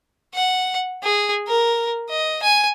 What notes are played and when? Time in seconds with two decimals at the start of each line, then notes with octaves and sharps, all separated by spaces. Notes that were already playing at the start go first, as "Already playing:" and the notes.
0.34 F#5
1.03 G#4
1.48 A#4
2.09 D#5
2.43 G#5